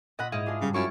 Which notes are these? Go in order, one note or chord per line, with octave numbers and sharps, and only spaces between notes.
A#2 D#5 F#5 B5
G#2 E4 D#5 F5
D4 F4 G#4
G2 C#3 G3
F#2 E4 F4 C#6